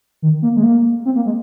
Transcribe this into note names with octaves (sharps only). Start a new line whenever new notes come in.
D#3
A#3
G#3
A#3
C4
A#3
G#3